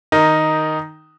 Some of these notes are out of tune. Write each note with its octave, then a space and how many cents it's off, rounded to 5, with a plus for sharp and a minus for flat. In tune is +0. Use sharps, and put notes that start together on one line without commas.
D#3 +0 D#4 +0 A#4 -5